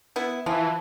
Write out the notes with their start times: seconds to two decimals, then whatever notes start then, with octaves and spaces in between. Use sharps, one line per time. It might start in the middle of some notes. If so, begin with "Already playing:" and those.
0.16 B3 E4
0.46 E3 F3